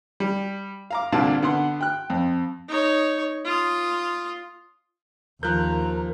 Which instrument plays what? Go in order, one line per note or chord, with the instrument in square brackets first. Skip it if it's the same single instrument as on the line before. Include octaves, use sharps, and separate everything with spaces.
[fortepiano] G3
F5 A#5 D6
C2 A#2 D3 F5 A5
D3 B3 F#5 C6
G5 F#6
F2
[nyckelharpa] D#4 C#5
F4 D#6
[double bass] D#2 [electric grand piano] F3 F#6 G6 [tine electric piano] A#4 [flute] A#5